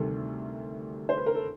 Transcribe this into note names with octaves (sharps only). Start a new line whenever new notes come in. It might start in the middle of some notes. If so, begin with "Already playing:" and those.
Already playing: D2 C3 D#3 G3 A3 A4
C5
B4
A#4
A4